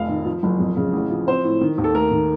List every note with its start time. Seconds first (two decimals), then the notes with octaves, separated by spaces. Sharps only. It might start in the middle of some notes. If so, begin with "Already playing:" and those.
Already playing: F1 F2 F5
0.09 D#3
0.26 F3
0.43 F#1
0.60 F2
0.77 C#3
0.93 A1
1.11 F3
1.27 C4 C5
1.44 A2
1.61 D#3
1.78 D#2
1.84 A4
1.94 A3 A#4
2.11 D#3